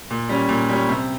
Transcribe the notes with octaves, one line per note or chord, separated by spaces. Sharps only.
A#2
G3 C#4
A#2
G3 C#4
C3